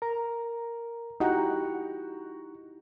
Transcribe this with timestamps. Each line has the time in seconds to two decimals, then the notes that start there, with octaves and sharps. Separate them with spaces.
0.02 A#4 A#5
1.20 D#4 E4 F#4 G4 F#5 G5 A#5